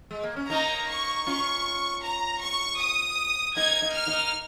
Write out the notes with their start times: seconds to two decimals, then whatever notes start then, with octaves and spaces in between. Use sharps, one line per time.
0.11 G#3
0.23 A#3
0.36 C#4
0.50 A#3 D#4 A#5
0.89 C#6
1.26 C#4 F4 C#6
2.03 A#5
2.41 C#6
2.79 D#6
3.56 A#3 D#4 G#6
3.82 A#3 D#4
3.94 F6
4.07 A#3 D#4